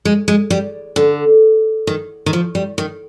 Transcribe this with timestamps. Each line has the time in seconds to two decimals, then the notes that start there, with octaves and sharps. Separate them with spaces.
0.05 G#3
0.28 G#3
0.50 G3
0.96 D3
1.87 D#3
2.26 D#3
2.33 F3
2.55 G3
2.78 D#3